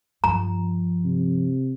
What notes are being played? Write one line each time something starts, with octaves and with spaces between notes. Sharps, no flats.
G2 F3 A#5
C3